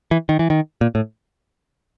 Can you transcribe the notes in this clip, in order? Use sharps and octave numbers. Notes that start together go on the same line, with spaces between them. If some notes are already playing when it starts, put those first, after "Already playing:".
E3
D#3
E3
D#3
A#2
A2